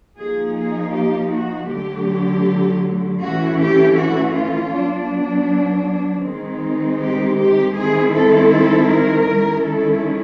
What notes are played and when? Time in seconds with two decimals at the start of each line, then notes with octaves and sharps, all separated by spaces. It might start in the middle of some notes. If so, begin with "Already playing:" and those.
0.17 F3 A#3 D#4 G#4
0.55 G#4
0.93 G4
1.31 F#4
1.68 D3 F#3 A3 G4
3.20 E3 A3 C#4 F#4
3.58 G4
3.96 F#4
4.33 F4
4.72 F#3 B3 D4
6.23 D#3 G#3 C4 D#4
6.99 G4
7.37 G4
7.74 D#3 G#3 C4 E4 G#4
8.12 A4
8.50 A4
8.88 A#4
9.26 D#3 G#3 C#4 E4
9.63 A4